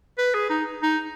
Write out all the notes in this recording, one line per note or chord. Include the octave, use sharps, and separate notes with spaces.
B4
G#4
D#4
D#4